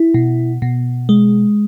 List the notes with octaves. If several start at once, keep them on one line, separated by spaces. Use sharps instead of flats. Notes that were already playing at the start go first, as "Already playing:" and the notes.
Already playing: E4
B2
B2
G#3